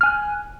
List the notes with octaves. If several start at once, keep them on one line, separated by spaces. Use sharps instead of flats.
G#5 F6 F#6